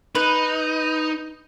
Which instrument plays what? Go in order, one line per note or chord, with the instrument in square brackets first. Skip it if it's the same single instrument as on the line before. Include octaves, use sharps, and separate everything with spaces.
[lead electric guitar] D#4 [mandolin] B4